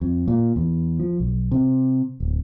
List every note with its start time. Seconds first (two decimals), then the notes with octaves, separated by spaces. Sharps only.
0.01 F2
0.28 A#2
0.56 E2
0.99 F3
1.20 B1
1.51 C3
2.20 D1